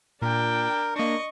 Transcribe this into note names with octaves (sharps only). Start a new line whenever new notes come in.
A#2 D4 A#4 G5
A#3 D4 D#5 C#6